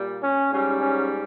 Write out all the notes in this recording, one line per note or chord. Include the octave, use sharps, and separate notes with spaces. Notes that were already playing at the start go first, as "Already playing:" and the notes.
Already playing: A#2 G3
C#4
G#2 G3 C#4
C#4